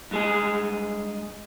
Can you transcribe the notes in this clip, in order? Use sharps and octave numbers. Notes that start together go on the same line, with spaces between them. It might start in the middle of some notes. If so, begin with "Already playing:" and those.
G2 G#3 G#4